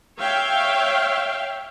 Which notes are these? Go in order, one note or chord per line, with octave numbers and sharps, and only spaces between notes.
C#5 E5 F5 G5